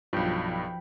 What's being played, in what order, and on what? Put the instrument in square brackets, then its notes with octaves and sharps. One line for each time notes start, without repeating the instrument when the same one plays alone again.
[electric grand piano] B1 G2 [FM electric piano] F3 G5 B5